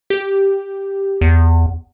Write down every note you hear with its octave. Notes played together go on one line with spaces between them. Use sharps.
G4
E2